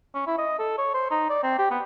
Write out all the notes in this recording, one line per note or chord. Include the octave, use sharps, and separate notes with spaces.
C#4
E4
D#5
A4
C#5
C5
D#4
D5
C4
G4
B3